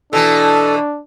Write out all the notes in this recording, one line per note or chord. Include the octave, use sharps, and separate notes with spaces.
B2 E3 D4 A4